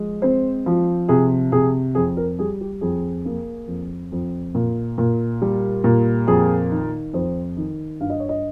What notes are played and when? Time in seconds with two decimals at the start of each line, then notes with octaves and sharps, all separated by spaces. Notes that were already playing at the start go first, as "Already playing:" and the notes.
Already playing: F3 G#3
0.22 C4 C5
0.66 F3
1.08 C3 G#4
1.52 C3 G#4
1.95 F2 G#4
2.17 A#4
2.39 G3 G#4
2.61 G4
2.81 F2 G#4
3.25 A#3
3.68 F2
4.12 F2
4.55 A#2
4.98 A#2
5.42 G3
5.84 A#2
6.27 F2 G#4
6.71 D#3
7.14 F2 C5
7.57 D#3
8.00 G2 F5
8.10 D#5
8.20 C#5
8.29 D#5